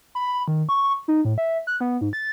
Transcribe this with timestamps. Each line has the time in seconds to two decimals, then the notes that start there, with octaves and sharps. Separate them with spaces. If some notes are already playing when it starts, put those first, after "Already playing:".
0.15 B5
0.48 D#3
0.69 C#6
1.08 D#4
1.25 A2
1.38 E5
1.67 F#6
1.81 B3
2.01 G#2
2.13 A6